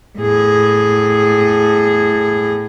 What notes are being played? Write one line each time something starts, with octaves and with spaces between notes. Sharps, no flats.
A2 G#4